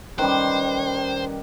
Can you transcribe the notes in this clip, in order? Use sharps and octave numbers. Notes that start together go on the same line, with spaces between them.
D#3 G3 C#4 B4 C5 F#6